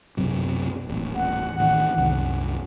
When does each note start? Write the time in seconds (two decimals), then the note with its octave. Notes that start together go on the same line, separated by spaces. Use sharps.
0.17 B1 F#2 C3
0.87 D#1 A1
1.15 F#5
1.58 A1 D#3
1.97 C2 F#2